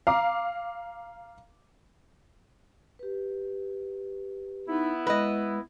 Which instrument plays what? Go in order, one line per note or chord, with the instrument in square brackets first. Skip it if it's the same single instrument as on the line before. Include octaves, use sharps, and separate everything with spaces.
[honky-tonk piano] F5 A#5 D6
[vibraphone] G4 B4
[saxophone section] B3 E4 [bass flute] D#4
[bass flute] G#3 [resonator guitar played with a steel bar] B4 D#5